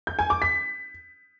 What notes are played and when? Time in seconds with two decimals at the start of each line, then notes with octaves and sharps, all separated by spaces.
0.07 G6
0.19 G#5
0.30 D6
0.42 B6